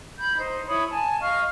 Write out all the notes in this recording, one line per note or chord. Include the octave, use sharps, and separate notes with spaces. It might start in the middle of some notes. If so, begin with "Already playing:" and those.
B5 G6
D#4 C5
E4 C#5 B5 D#6
G#5 A5
D#5 F5 C#6 F6